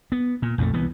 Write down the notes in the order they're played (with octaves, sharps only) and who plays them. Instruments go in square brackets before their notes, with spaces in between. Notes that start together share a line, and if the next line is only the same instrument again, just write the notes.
[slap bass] B3
A#2
A#1 F2 E3 A3
C2 E3 B3